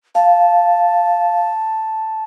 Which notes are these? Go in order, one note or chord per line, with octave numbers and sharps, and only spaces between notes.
F5 A5